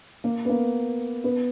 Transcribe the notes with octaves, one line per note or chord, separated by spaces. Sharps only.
A#3
B3
A#3
B3